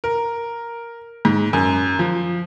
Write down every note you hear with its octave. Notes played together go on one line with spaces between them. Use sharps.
A#4
G#2
F#2
F3